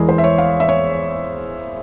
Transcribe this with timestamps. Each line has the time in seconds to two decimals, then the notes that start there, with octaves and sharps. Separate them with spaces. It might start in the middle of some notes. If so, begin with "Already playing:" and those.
Already playing: E2 E3 G#3 G#4 A#4
0.09 C5
0.18 E5
0.24 C#5
0.38 F5
0.60 E5
0.69 C#5